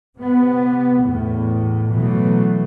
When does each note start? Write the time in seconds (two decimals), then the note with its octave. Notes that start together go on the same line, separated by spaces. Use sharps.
0.17 C3 B3
1.05 E2 A2
1.93 B2 E3 F#3 A3